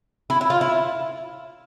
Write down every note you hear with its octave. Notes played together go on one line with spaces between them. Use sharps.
E4
E4
F4
E4